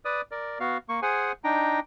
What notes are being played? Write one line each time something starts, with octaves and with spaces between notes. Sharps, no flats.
B4 D5 D#6
A#4 D5
B3 F#4 F5
A#3 C#6
G#4 C5 F#5 G#5
D4 D#4 G5 A#5